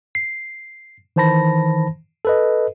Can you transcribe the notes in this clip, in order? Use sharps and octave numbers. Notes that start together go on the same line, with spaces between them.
C7
D#3 E3 C5 A5 B5 A#6
A4 B4 D#5